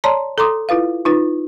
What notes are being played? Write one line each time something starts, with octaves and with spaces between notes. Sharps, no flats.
C#5 D5 A5 A#5 C6
A4 A#5 C6 D6 D#6
E4 F4 B4 F5
D#4 F4 B4